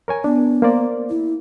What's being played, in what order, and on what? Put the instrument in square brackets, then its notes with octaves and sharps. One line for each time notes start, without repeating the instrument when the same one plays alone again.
[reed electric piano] A#4 C#5 G#5
[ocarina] B3 [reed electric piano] D4
[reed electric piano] A#3 C5 D5
[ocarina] E4